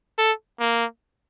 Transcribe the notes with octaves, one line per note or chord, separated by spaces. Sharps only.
A4
A#3